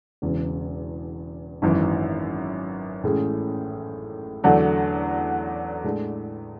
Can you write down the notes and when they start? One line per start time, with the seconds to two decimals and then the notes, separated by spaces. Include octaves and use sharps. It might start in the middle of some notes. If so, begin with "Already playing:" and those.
0.22 E1 E2 C#3
1.62 G#1 F#2 E3
3.03 A1 A2 G#3 C#4 G#4
4.44 E2 D3 F#3 A3 D4
5.84 A2 G#3 D4 A4